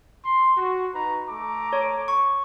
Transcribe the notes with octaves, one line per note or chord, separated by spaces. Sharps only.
C6
F#4
D#4 B4 A#5
A3 A#5 D6
C#5
C#6